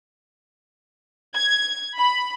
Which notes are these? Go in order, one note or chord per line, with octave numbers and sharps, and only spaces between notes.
G#6
B5